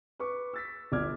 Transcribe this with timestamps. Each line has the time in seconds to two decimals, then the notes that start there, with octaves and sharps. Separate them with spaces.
0.19 B4 C#6 D6
0.53 E6 A6 B6
0.92 G1 D5 D6 F6 G#6